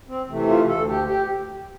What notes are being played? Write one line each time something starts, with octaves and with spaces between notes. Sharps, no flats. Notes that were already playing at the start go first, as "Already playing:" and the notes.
C4
C3 E3 A3
F4
D2 A4
G4
G4